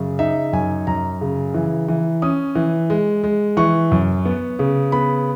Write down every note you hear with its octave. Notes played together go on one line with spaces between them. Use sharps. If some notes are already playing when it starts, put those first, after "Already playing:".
Already playing: F#2 C#3
D#4 E5
F#2 G#5
F#2 A#5
C#3
E3
E3
C#4 D#6
E3
G#3
G#3
E3 C#6
F#2
B3
C#3
B3 B5